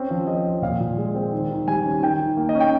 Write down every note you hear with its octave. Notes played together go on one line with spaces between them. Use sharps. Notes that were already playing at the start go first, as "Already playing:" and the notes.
Already playing: C4 C#4
F3
C4 D#5
F3
A#2 F5
A#2
G#3
C4
D#3
D#3
G3 G#5
C#4
D#3 G5
D#3
A#3
D#5
C#4
G5